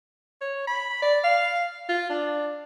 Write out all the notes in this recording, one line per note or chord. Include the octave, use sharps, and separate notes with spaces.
C#5
B5
D5
F5
F4
D4